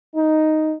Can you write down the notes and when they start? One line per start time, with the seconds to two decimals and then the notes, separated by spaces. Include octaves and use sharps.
0.14 D#4